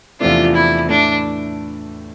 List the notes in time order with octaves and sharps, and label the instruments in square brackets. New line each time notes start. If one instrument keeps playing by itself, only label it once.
[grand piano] E2 C3 F3 A3 D4 [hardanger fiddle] F4
[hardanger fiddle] E4
[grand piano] A2 E3 A3 [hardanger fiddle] D4